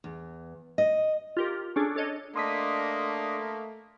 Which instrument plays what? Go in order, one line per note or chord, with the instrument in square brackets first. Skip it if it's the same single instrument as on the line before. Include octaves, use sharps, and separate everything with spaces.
[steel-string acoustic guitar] E2
D#5
[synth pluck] F4 G4 A#4
C#4 D4 G#4 A4
D4 A4 C#5 D#5
[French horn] A3 [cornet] A#3 [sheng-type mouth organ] D4 D#5 [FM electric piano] C6 D#6 B6